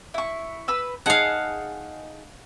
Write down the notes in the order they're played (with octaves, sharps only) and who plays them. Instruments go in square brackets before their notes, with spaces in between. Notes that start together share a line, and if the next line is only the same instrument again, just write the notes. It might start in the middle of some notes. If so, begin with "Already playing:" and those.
[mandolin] E4 C#6
B4 B5 E6
[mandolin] D#4 G#4 A5 [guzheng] F5 F#5